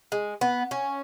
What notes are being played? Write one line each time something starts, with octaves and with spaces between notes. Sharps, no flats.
G#3
B3
C#4